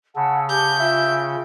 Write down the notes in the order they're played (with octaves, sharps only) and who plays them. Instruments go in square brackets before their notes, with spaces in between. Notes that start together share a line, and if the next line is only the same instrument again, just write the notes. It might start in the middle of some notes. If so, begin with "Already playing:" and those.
[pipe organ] C#3 [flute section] F#5 A5 E6
[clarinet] G4 [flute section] G#5 A5 [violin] G6
[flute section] F4 G5 [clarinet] E5